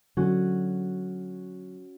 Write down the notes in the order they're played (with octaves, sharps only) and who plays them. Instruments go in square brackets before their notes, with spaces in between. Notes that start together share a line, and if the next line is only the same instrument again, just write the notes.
[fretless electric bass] D3 F#3 [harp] C#4 F#4